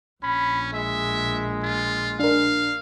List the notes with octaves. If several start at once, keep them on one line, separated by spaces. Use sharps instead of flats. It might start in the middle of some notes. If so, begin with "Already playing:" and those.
A#1 C#4 B5
G#3 E5
F4
D4 A#4 F5